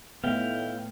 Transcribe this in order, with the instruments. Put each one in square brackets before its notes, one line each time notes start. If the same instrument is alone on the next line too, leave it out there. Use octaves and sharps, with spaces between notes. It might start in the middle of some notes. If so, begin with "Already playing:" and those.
[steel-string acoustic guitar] D#2 E4 [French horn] A2 [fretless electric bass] A3 B3 [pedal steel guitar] F5 G5